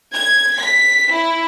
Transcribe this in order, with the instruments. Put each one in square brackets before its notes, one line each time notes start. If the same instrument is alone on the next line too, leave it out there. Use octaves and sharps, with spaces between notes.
[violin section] G#6
B6
E4